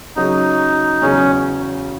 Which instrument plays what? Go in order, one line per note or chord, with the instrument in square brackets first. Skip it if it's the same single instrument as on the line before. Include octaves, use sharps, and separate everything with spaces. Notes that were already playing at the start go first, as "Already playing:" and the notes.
[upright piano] C#3 F#3 C#4 G#4 [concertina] D#4
[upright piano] E2 C#3 F#3 [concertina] C#4